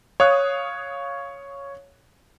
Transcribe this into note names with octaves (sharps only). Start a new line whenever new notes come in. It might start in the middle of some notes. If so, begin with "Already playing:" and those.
C#5 F5 D#6 F#6